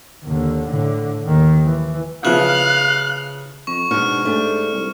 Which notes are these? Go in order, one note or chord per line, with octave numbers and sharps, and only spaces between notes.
D#2 D3
A2 D3
D#2 D#3
E3
C#3 F3 B3 E4 F5 F#6
F2 C#6
G#2 B2 D4 F#4 C#6 F6 C#7
A3 D4 G4
C2